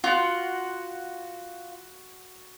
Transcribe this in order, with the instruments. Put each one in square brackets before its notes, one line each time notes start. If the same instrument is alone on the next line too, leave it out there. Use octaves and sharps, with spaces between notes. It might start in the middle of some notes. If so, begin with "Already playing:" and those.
[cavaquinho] F4 [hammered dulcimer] F#4 F#5